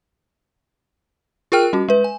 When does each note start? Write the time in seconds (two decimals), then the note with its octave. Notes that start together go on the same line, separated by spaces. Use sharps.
1.52 F4 G#4 A#4 G5 F6
1.73 G3 C#4 F#4
1.89 G#3 B4
2.04 G#5